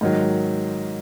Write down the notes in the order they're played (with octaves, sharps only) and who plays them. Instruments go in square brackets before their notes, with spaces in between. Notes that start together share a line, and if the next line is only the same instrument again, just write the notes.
[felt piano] G#2 D#3 F#3